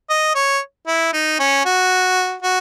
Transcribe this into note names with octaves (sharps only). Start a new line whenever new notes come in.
D#5
C#5
E4
D#4
C#4
F#4
F#4